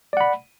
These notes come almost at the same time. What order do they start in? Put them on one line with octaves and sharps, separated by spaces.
D5 F#5 B5